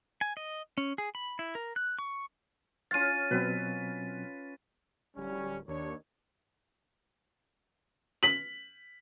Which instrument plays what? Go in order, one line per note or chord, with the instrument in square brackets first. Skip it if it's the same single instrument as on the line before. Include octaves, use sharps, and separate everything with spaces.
[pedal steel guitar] G#5
D#5
C#4
G#4
B5
E4
A#4
F#6
C#6
[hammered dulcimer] C#4 F4 F5 [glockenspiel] A6 D#7
[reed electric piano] B2 F#3 C4 [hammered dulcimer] B4
[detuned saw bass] D1 [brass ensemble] G3 C#4
[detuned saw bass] D#2 [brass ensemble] D4 C#5
[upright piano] B6 F#7